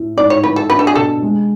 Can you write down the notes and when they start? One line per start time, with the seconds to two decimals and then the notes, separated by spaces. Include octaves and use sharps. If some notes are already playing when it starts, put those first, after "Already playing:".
Already playing: A2
0.17 G#2 D5
0.30 C#5
0.44 E3 B4
0.56 A4
0.70 D4 B4
0.79 A4
0.87 G#4
0.95 B2 A4
1.22 G#3